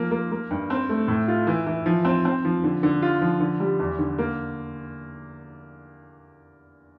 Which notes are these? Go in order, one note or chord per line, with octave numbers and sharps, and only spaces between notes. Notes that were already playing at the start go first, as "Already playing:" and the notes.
Already playing: F3 A#3
A#3
A#3
G2
C4
A3
A2
F4
E3
E3
F3
C4
C4
F3
D3
D3
F4
F3
D3
G3
E2
D3
A#3